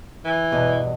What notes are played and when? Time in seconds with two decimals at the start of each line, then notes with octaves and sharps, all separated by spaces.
0.25 E3
0.52 E2 G2 B2